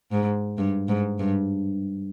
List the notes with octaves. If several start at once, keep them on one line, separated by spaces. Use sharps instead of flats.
G#2
G2
G#2
G2